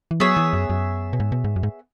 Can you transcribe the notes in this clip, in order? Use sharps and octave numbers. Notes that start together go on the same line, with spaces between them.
E3
F#3 B3 G#4 C#5 E5
E3
F#2
F#2
B2
G#2
B2
G#2
F#2
G#2